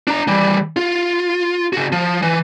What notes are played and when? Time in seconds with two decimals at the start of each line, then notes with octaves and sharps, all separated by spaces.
0.07 D4 A#5
0.28 E3 G3
0.77 F4
1.73 C#3 F#4
1.92 F3
2.22 E3